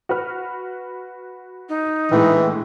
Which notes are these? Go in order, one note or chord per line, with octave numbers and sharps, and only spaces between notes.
F#4 B4 F6
D#4
A#1 A2 E3 G#3